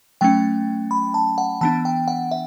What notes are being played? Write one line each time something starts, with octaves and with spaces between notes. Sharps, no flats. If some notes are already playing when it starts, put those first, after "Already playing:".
F#3 A3 C#4 G5
B5
A5
F#5
E3 B3 D4 A5
G5
F#5
E5